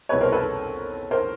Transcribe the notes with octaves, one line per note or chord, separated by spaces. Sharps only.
C2 B2 G#3 B4 C#5
A#4 C5
A4 B4
A#4 C5